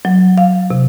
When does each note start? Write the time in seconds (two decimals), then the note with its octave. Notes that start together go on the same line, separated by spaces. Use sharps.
0.05 F#3
0.38 F5
0.71 C3